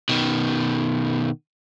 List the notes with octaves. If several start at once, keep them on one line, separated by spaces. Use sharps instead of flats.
B2 D#3